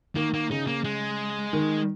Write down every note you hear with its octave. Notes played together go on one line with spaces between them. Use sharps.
D#3 A#3
A#3
C#3 D#4
A#3
G#3
D#3